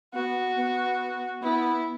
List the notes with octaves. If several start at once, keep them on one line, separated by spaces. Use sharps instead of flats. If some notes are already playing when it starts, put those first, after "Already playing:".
B3 F#4
B3
B3 E4